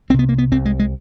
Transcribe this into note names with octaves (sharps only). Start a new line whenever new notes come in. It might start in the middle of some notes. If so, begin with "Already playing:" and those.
C2 C3 B3 C4
A#3
B3
C2 C3 C4
G#3
G#3